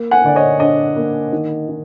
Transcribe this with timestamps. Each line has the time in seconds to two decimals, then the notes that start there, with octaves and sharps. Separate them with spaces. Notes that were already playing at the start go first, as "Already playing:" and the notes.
Already playing: A#3
0.11 F#5 G#5
0.24 D3 D5
0.35 C#5 D#5
0.60 D4 C#5 D#5
0.96 A#3
1.32 D#3
1.68 D#3